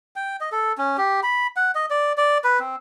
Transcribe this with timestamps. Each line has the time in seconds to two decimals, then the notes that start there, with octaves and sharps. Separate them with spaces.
0.16 G5
0.41 D#5
0.52 A4
0.78 C#4
0.98 G4
1.23 B5
1.56 F#5
1.75 D#5
1.90 D5
2.18 D5
2.44 B4
2.60 C4